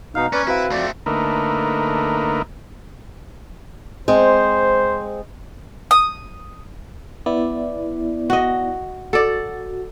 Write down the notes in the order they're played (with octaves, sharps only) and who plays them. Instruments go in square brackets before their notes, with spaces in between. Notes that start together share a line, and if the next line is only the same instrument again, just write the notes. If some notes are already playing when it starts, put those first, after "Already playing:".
[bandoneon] B2 D#4 F5 [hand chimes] A#5 F6
[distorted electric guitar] C#4 [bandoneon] B4 D5
[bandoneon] C4 B4 [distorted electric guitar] E4 [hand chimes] F#4 F5
[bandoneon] F2 D5 [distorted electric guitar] A3 C4
[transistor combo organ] D3 A3 A#3 D#4 A#4 B4
[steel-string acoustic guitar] G#3 C4 [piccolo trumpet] C5
[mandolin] D#6
[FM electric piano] B3 E4 D5
[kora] F#4 D#5
[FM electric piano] F#4 [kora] A4 D5